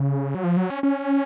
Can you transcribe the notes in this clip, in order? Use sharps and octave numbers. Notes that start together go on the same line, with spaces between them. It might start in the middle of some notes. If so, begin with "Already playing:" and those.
Already playing: C#3
F#3
F3
F#3
C#4
C#4